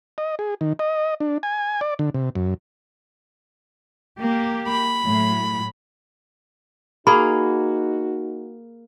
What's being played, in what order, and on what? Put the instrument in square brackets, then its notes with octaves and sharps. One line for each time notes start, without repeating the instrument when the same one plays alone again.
[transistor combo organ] D#5
G#4
D#3
D#5
D4
G#5
D5
D3
C3
F#2
[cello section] A#3 G4
[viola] B5
[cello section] A2 F#3
[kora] A#3 G#4 [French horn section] D#4 F#4 [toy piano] B5